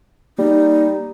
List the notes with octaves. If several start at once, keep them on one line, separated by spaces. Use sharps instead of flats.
G3 A#3 D#4